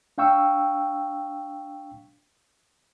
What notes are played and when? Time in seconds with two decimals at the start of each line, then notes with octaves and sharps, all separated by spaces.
0.18 D4 F5 G5 C#6 E6